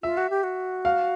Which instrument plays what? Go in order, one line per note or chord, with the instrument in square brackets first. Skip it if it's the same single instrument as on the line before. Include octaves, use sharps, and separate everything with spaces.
[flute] F4 [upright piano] E5
[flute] F#4
G4
F#4
[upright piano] F5